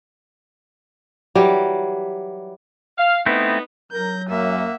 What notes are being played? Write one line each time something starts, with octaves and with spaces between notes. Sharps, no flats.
E3 F#3 G3 G4
F5
A3 B3 C4 D#4 E4
F#3 A#4 G6 A#6
F#2 A#3 E5 F#5